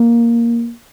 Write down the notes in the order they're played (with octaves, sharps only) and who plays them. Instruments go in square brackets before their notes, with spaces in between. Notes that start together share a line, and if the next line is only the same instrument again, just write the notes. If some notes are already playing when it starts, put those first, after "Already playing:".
Already playing: [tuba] A#3